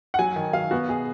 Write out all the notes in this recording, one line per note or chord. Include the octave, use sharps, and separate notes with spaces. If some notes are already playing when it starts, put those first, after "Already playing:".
F#5
F#3 G#5
D#3
F#3 F5
B3 F#4
B2 G#4